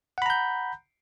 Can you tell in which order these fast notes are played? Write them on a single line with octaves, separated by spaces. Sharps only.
F#5 B5 A#5 G6